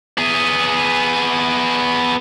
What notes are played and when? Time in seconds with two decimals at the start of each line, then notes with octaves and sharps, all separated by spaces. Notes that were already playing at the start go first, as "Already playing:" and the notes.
0.17 B3 G#4